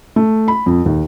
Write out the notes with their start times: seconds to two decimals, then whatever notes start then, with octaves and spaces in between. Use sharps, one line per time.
0.16 A3
0.48 B5
0.66 F2
0.86 D#2